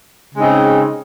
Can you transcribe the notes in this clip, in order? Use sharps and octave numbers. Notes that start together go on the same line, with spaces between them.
C#3 G#3 C4 D#4